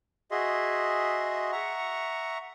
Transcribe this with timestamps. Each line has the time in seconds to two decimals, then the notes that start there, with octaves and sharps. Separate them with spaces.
0.31 F#4 G#4 D#5 E5 C6
1.52 E5 F#5 A#5 C#6